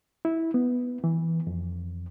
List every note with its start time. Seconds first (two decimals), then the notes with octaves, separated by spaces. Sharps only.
0.25 E4
0.54 B3
1.04 E3
1.47 F2